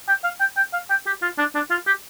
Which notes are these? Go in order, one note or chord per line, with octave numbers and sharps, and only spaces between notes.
G5
F5
G5
G5
F5
G5
G4
F4
D4
D4
F4
G4